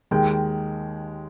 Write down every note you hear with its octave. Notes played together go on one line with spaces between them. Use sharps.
D#2 D#3 G#3 G5